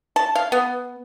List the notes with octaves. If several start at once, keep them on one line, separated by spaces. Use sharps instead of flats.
A5
F5
B3